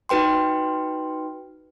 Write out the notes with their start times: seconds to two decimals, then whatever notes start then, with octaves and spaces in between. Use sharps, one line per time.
0.09 D#4 F#4 B4 G5 C6